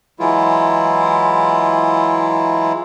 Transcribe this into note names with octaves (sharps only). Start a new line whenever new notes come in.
E3 F#3 G#3 E4 F4